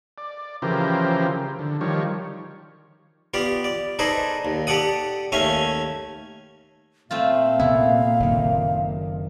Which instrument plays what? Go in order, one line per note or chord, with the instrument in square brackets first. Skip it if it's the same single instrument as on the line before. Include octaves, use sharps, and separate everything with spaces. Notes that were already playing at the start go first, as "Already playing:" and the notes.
[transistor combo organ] D5
C#3 E3 F3 G4 A#4 C5
D3
D#3 F3 G3 C#5
[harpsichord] B3 F4 G4 D5
D5
D#4 G#4 A4 B4 C5 D5
D#2
G4 A4 D5 F#5 D#6
D#2 A3 C#4 E5 F5 G#5
[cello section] A#2 [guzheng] A3 C4 F4 [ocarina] F5
[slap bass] C3 B3 [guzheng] E4
[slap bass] F#1 D#3